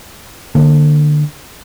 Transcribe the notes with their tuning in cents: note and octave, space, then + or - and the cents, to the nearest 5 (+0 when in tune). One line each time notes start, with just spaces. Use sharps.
D3 +25 A#3 +0